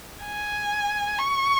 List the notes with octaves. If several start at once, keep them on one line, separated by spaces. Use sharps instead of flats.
G#5
C#6